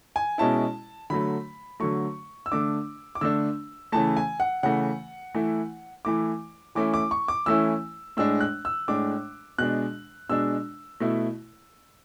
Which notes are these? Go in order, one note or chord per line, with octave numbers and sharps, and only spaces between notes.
G#5
B2 G#3 C#4 E4 A5
D3 F#3 A3 B5
D3 F#3 A3 C#6
E6
D3 A3 D4 D6
D6
D3 A3 D4 E6
C#3 E3 A3 A5
G#5
F#5
C#3 E3 A3 F#5
E3 A3 E4
E3 A3 E4 D6
E3 A3 C#4 E4 D6
D6
C#6
D6
E3 A3 C#4 E4 E6
A2 G#3 D4 E6
F#6
E6
A2 G#3 D4 D6
B2 G#3 D4 F#6
B2 G#3 D4 E6
B2 A3 E4